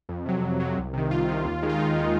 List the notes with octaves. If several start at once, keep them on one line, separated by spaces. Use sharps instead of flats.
F2
C3 F#3
F2
C3 F#3
C2
C3 D#3
C2 F4
C3 D#3
D#2
D#3 G#3
F4
D#2 D#4
D#3 G#3